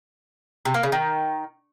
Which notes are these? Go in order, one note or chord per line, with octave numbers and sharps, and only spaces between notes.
C3
A#3
C#3
D#3